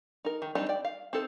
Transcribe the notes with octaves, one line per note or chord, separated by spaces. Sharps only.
D#4 A#4
D#3
G3 C4 D4 D#4 G4
D5 G5
F5
C4 D#4 A4 C5